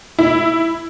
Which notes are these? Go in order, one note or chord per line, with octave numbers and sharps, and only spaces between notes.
E4